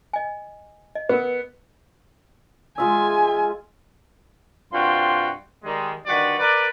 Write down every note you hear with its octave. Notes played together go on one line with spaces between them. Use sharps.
D#5 G#5
D#5
B3 A#4 B4
G#3 F4 E5 G#5
G2 C3 F4 F#4 G5 C6
D#3 G3 G#3
D3 D#3 G3 F#4 B4 D5
A#4 B4 D5